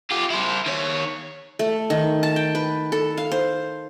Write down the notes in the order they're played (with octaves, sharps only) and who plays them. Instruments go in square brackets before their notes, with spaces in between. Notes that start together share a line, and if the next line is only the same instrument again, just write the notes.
[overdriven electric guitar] F4 G4
E4 C5
D#3 C#5
[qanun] A3
D#3
A5
G5
B4
A4
F5
C5